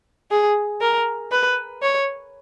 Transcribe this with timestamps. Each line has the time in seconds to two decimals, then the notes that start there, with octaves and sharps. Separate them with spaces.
0.31 G#4
0.81 A#4
1.31 B4
1.82 C#5